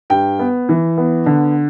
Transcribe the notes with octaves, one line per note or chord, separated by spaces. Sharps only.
G2 G5
B3
E3
B3
D3